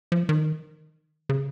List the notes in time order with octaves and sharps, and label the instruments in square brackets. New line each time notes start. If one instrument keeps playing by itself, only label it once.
[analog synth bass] F3
D#3
C#3